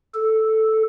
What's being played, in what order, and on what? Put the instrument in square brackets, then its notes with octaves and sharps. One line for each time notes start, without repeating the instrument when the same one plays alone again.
[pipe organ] A4